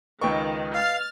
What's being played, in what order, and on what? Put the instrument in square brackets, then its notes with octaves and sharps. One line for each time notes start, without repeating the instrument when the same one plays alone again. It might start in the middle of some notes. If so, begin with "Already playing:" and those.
[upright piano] C#2 G5 C#6 [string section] D#3 [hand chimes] B4 D#5
[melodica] F5 [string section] F6 A6